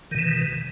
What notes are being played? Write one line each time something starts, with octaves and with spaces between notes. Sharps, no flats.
B2 D#3 E3